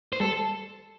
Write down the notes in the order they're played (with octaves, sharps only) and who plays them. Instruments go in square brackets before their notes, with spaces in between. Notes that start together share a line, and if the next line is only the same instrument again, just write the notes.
[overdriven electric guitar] C5
[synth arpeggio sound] G3 [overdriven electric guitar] A4